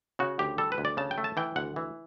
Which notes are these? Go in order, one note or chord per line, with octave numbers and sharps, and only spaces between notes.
C#3 F#4
D2 G4
G3 A4
B4
D2
D5
C#3 A5
G5
A3
A5
E3 G5
D2 F#5
E3